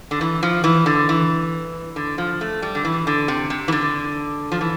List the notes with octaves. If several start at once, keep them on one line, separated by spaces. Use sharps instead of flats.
D3
E3
F3
E3
D3
E3
D3
F3
A3
G3
D3
E3
D3
C3
C3
E3
D3
F3
E3